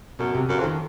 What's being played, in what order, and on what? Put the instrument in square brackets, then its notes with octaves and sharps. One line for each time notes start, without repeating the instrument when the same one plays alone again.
[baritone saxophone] F#2 [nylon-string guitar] B2
[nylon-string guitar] C3
[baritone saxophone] F#2 [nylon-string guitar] C#3
[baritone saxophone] F2
[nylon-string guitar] D#3